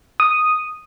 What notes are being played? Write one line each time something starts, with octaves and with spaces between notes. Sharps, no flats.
D#6